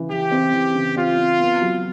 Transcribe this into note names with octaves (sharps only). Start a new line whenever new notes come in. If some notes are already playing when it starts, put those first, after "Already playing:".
Already playing: C#3 E3
E3 G4
C4
E3
C#3
C4 F4
C4
B3
F#3